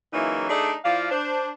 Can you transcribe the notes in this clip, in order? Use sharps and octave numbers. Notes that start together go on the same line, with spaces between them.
C#3 E3 F#3 A#3 D#4 E4
A3 D4 D#4 G#4 D5
F3 E4 D5 F5
D4 C5